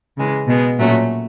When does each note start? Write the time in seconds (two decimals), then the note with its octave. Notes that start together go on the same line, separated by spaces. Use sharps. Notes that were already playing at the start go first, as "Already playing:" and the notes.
0.18 C#3 E3 G#3
0.48 B2 G#3 B3
0.78 A#2 F#3 A3 C#4